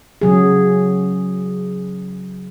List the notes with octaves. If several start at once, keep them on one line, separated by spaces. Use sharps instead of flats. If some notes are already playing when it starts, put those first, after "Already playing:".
C#3 F#3 G#4